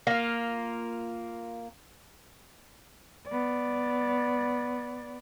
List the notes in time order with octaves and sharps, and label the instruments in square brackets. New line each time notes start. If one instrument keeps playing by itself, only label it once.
[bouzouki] A#3 F4
[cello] B3 D5